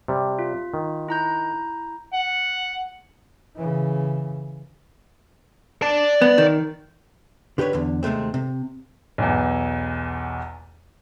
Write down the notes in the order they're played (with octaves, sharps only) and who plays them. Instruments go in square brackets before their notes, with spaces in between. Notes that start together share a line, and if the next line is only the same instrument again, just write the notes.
[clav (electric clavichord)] C3 G3
[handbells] F4
[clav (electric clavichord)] D#3
[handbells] E4 A#5 G6
[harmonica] F#5
[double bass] C#3 E3
[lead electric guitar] D5 A5
[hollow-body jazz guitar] B3
D#3
D3 G4 A#4 B4 C#5
E2 D3
D#2 C3 G#3 A3 C4
C3
[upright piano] B1 E2